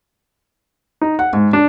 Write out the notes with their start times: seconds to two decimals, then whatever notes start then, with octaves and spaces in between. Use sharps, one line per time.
1.02 D#4
1.19 F#5
1.33 G#2
1.53 D4